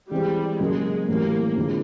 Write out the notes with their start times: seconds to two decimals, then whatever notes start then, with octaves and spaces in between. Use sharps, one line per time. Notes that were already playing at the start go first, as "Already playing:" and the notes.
0.11 E3 G3 G#3 C4
0.60 C#3 F#3 G#3 A#3 C#4
1.08 A2 E3 G3 A#3 C4
1.56 F2 D3 F3 G#3